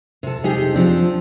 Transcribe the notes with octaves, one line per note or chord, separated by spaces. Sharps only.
C3 A4
C3 D#4 G4 G#4
F3 C4 D4